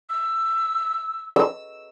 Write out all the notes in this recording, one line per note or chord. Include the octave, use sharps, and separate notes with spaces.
E6
E6